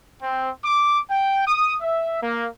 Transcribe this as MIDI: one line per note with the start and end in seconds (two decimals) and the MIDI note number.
0.21 0.50 60
0.63 0.99 86
1.10 1.43 79
1.47 1.75 87
1.82 2.20 76
2.22 2.47 58